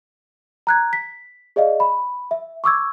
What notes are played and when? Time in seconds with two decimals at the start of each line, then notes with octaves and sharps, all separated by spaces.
0.67 A#5 F#6 G#6
0.93 B6
1.56 G#4 D5 D#5 F5
1.80 B5
2.31 E5
2.64 C#6 D6 E6 G#6